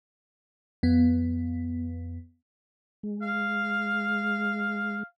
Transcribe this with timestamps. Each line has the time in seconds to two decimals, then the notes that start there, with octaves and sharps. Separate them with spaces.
0.83 F2 B3
3.03 G#3
3.22 F5